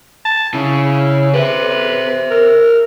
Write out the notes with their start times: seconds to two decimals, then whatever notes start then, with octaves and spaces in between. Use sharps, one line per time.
0.25 A5
0.54 C#3 E4
1.34 B4 C5 E5
2.31 A#4